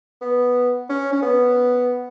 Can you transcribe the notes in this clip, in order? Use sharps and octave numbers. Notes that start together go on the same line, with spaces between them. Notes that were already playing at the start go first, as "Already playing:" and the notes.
B3
C#4
C#4
B3